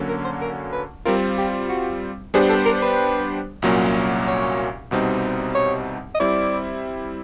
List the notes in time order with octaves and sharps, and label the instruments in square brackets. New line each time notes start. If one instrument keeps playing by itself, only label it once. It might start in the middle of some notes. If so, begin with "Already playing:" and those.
Already playing: [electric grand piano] D3 F#3 A#3 C#4
[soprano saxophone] A#4
C5
A#4
B4
[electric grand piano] G3 C4 F4 [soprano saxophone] A#4
[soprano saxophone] G4
F#4
[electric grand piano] G3 B3 D4 G4 C5 [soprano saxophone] G#4
[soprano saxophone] A4
A#4
B4
[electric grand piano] C2 A#2 F#3 A#3 C#4
[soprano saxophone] C#5
[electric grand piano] C2 B2 G3 C4 D#4
[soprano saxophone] C#5
D#5
[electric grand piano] G3 C4 E4 [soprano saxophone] D5